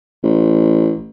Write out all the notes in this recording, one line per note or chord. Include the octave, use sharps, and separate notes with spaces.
A1